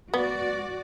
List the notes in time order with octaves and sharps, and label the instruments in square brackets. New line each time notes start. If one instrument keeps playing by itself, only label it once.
[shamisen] B3 [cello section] F#4 D5